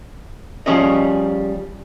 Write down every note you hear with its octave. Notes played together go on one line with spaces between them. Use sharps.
F3 G3 C#4 G#4 D#5